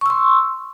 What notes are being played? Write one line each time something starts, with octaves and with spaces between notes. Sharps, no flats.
C6 C#6 E6